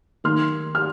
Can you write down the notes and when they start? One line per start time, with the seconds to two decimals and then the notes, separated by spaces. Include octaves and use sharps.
0.24 D#3 A#3 D#4 C6 F6
0.75 F6